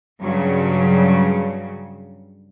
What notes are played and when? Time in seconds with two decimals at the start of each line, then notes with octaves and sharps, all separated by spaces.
0.22 G2 C#3 F#3